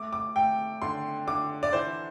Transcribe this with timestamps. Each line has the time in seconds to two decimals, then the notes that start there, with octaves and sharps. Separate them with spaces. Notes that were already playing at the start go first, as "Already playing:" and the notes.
Already playing: A3 D6
0.13 D6
0.36 A3 G5
0.82 D3 C6
1.27 D3 D6
1.63 D5
1.73 E3 C5